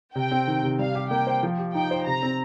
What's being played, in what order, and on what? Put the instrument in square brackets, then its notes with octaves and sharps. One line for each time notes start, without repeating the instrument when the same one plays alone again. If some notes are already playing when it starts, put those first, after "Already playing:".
[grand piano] C3 [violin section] G5
[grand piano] C4
D#3
C3
[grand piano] G3 [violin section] F5
[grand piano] G4
[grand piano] A#3 [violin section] G5
[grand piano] C5
F3
G4
[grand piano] D#4 [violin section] G5
[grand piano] C5
[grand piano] C3 [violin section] A#5
[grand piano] C4